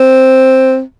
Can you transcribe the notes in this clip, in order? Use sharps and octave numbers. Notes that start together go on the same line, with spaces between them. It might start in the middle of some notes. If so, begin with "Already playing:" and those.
Already playing: C4